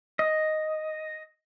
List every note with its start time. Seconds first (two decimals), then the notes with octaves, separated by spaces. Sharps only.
0.19 D#5